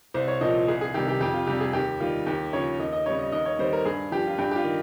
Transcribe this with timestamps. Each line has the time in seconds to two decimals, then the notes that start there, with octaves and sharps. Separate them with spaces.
0.14 C2 C5
0.28 C#5
0.41 A#2 F3 D#5
0.68 C2 G#4
0.81 G#4
0.94 C3 D#3 G3 G4
1.08 G4
1.20 F2 G4
1.34 F4
1.47 C3 G3 G4
1.60 G#4
1.73 D#2 G4
2.00 D#3 G3 F4
2.26 D#2 G4
2.53 C#3 F3 C#5
2.79 D#2 D#5
2.93 D#5
3.06 C#3 G3 C#5
3.19 D#5
3.32 D#2 D#5
3.46 C#5
3.59 D#3 G3 C5
3.73 A#4
3.85 G2 G#4
4.12 F3 G4
4.27 F4
4.38 G2 G4
4.51 G4
4.56 F4
4.64 D#3